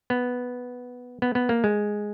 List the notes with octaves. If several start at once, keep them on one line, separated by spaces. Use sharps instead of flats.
B3
B3
B3
A#3
G#3